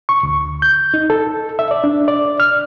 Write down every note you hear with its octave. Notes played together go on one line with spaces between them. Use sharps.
C#6
D2
G6
D#4
A4
E5
D5
D4
D5
F6